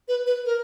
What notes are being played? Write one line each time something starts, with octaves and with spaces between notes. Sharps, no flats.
B4
B4
A#4